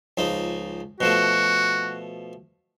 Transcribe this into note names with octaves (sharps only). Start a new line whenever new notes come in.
C#2 F3 D#4
B2 F3 A3 F#4